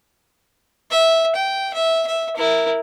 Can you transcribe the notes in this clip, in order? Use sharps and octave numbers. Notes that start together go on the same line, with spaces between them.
E5
G5
E5
E5
E4 A#4